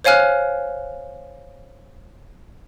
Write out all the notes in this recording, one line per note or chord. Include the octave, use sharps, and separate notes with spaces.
C5 C#5 F5 G#5 F6 F#6